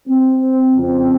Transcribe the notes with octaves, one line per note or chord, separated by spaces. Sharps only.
C4
F2 C#3 F3 C4